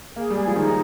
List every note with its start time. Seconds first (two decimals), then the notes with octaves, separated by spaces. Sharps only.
0.16 A#3 G#4
0.30 G3
0.36 G#3 G#4
0.47 F3
0.56 D#3 D#4